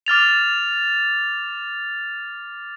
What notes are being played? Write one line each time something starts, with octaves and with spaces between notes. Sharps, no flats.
D6 F6 A6 F7